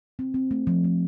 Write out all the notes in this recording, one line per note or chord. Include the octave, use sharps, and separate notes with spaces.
C4
C4
A3
F3
A3